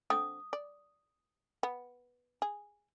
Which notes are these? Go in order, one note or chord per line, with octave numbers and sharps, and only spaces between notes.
D3 C4 D#6
D5
B3
G#4